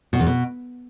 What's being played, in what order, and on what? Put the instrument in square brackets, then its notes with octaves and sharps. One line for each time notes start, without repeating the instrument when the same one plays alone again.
[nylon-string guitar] B2
E2
B2